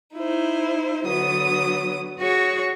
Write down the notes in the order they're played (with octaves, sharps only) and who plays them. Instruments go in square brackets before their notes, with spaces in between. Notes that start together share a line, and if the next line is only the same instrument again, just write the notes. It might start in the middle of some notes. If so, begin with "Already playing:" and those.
[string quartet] D#4 E4 C5
D3 F#3 B3 D#6
F#4 G#4 C#5 C#6